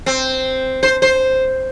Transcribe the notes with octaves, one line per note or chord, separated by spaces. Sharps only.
C4
C5
C5